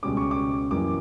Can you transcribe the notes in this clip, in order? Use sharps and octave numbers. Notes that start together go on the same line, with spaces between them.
C#2 B2 G3 C#4 D6
C#6
D6
F#2 E3 G3 A#3 D6